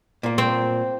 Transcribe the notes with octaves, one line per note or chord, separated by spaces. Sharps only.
A#2 A#3
C4